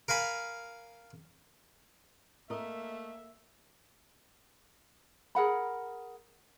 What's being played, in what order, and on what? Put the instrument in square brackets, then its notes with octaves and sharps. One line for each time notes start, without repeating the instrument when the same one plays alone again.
[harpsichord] A#4 F5 G#5 B5
[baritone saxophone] A3 [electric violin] A#3 E5 [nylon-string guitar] A#4 D#5
[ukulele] G#4 A#4 F#5 B5